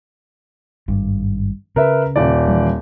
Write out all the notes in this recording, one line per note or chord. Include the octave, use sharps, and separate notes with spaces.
G#1 G2
C#3 A#4 B4 E5
D#1 D5
E3 G3